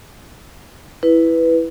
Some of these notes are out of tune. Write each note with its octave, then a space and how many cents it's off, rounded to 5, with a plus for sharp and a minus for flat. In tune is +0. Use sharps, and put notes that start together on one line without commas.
E4 +0 B4 +0